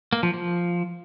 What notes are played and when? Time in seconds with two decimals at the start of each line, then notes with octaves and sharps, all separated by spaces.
0.13 A#3
0.23 F3
0.33 F3